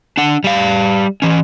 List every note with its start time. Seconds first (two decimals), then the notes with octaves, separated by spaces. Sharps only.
0.17 D4 F#5
0.44 G3 F5
1.22 E3 C#4